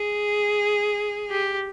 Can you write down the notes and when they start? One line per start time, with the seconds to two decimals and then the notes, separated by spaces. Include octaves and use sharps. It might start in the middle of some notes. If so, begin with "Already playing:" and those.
Already playing: G#4
1.30 G4